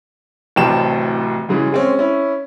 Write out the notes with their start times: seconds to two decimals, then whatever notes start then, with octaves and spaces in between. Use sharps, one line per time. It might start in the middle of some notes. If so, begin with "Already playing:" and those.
0.56 D1 A1 C3 G5 A5 E7
1.49 F#2 C#3 E3 G#3
1.72 G#3 C4 C#4
1.99 C#4 E4